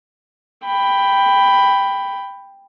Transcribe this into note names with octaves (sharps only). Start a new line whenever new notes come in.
G5 B5